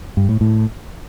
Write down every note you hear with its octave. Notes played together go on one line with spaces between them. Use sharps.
G2
A2
A2